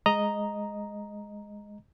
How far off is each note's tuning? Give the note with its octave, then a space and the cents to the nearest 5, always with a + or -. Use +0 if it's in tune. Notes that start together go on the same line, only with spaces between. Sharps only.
G#3 +0 D#5 +0 A#5 +0